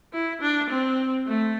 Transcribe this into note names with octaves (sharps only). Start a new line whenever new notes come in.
E4
D4
C4
A3